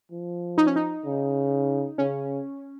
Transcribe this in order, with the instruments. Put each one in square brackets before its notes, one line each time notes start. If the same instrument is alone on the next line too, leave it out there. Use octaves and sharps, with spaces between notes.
[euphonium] F3
[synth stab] D#4
C#4
D#4
[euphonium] C#3
[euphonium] C#3 [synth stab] C#4